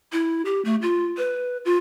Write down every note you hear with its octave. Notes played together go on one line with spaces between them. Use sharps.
E4
G4
A3
F4
B4
F4